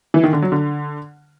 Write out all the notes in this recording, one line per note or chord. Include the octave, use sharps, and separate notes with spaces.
E3
D#3
D3
F#3
D3